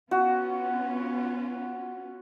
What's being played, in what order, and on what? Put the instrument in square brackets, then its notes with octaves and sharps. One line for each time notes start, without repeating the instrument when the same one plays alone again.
[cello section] B3 C#4 F4 [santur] F#4